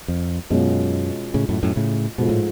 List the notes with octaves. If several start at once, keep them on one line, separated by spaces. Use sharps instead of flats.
F2
F#2 B2 G#3 C#4 F4
A2 C#3
F#2 A2
F#2 A2
A2 C#3
G#2 B2 F3 A3 F4
A2